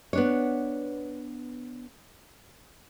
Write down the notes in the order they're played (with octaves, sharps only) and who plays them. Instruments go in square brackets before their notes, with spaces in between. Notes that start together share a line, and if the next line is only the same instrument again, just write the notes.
[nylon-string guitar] B3 D4 C#5